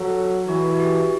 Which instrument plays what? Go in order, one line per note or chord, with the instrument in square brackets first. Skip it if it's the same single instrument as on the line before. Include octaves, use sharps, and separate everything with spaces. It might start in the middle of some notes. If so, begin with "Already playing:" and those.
Already playing: [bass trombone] F#3 [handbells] A4
[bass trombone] E3 [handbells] F#4
[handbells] F#4
G4